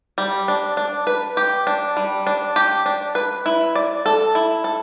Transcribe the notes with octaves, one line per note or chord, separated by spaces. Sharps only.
G3
D4
D4
B4
G4
D4
G3
D4
G4
D4
B4
E4
D5
A4
E4
A4